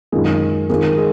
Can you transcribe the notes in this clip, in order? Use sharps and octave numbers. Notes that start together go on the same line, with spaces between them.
F#2 D#3 G#3 A#3 F4 G#4
D#3 G#3 A#3 F4 G#4
G#3 G#4